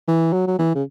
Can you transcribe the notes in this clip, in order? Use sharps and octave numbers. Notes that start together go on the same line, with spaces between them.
E3
F#3
F#3
E3
C#3